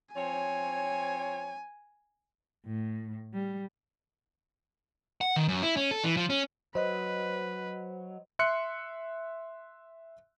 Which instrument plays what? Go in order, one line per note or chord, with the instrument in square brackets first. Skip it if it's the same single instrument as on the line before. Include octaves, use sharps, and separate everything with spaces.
[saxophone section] F3 C4 C#5 [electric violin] G#5
[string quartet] A2
G3
[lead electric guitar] F#5
D#3
F#2
E4
C#4
A4
E3
F3
C#4
[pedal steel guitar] F#3 [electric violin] B4 [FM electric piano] C5 D#5
[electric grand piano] E5 C6 F#6 C#7